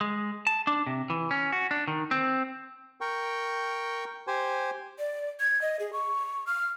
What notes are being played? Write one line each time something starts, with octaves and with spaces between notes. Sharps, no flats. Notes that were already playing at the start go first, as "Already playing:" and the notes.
G#3
A5
D4
C3
E3
C#4
F#4
D4
D#3
C4
A#4 G5 C#6
G4 C5 G#5
D5
G#6
D#5
G#4
C#6
F6